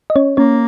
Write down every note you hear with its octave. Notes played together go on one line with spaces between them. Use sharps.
D#5
C#4 C#5
A#3 C#4 C#5